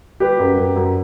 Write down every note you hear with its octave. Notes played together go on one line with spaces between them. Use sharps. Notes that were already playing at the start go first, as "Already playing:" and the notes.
G3 G4 B4
F#2
F#2
F#2